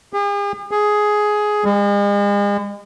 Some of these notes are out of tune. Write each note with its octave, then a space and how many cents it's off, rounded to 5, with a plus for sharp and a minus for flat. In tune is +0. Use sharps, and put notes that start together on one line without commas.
G#4 -45
G#4 +10
G#3 -40